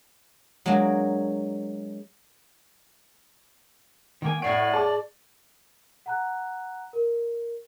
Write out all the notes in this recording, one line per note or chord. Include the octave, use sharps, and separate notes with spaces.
F#3 G#3 A#3 D4 F#4
D#3 A#3 G5 G#5
A2 F#4 C#5 D5 F#5 C7 D7
G#4 A5 D6
F#5 A#5 F#6
A#4